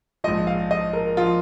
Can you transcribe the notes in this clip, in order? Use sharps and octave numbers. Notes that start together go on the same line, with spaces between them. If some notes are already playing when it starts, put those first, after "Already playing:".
A#1 G#2 F3 D#5
F5
D#5
A#4
F3 F4